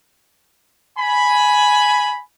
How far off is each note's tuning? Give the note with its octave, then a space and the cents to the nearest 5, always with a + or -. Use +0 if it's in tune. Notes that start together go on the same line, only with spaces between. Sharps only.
G#5 +10 B5 +0